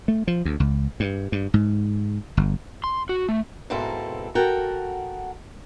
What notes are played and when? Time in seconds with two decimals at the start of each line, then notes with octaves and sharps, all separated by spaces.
0.08 A3
0.28 F3
0.45 D2
0.60 C#2
1.00 G2
1.32 G2
1.54 G#2
2.37 G1
2.84 C6
3.09 F#4
3.29 A3
3.70 G#2 B2 A#3 C4 E4 A4
4.35 F#4 A4 A#4 F#5 G5